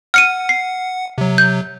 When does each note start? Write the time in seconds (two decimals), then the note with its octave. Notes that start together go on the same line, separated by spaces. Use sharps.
0.14 F#5 F6 C#7 D#7
0.49 C7
1.18 C3 F#3
1.38 G6